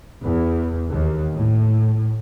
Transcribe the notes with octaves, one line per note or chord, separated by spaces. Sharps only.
E2
D#2
A2